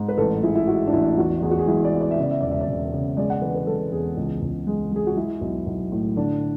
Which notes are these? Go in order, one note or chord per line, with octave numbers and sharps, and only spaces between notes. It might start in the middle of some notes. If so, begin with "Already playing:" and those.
Already playing: G#2
B4
A1 A4
G#3 E4
E4
G#3 F#4
D4
A1 E4
E2 F#4
E2 G#4
F#4
G#4
G#3 E4
D5
B3
D5
E5
C#3 D5
E5
E1 D5
E5
D5
E1
C#3
G#3 D5
F#5
E2 B4
B4
G#3 A4
E2 G#4
C#2
C#2
G#3
G#3 G#4
F#4
G#3 E4
B1
B1
A2
D3 D4